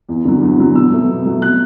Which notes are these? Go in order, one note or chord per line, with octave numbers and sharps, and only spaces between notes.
E2
D3 F#3
E2
D3 F#3
B2 E6
F#3 A3
B2
F#3 A3
B2 F#6